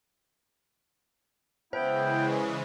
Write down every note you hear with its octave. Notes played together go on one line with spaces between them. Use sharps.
C#3 E3 G#3 B3 E4 C5 G5